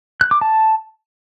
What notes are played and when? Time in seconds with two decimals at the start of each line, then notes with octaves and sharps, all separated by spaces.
0.21 F#6
0.31 D6
0.41 A5